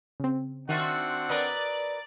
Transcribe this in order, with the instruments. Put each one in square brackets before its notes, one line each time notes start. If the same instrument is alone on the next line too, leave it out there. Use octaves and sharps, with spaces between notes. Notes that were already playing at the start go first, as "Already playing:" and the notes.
[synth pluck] C#3 C4
[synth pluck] D#3 [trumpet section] C4 D4 F#5 [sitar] F4 F#4 E5
[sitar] A#4 B4 D#5 [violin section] D5